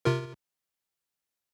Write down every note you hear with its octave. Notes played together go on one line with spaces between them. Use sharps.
C3 F4 A#4